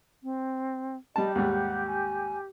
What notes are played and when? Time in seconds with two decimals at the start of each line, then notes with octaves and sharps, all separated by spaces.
0.23 C4
1.16 G3 G4 D#5 A5
1.35 D#2 G#2 G3 F#5
1.88 G#5